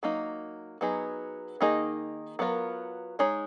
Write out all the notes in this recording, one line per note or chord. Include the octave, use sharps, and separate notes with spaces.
F#3 A#3 D#4
F#3 B3 D#4 G#4
D#3 A#3 D#4 G#4 D#5
F#3 B3 F4 A#4
G#3 D#4 G#4 C#5